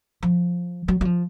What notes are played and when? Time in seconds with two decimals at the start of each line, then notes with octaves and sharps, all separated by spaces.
0.23 F3
0.88 F#3
1.01 F#3
1.05 F3